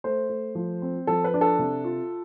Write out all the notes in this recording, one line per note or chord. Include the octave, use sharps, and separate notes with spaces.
A3 C5
A3
F3
C4
F3 A4
B4
D4
A4
C3
F4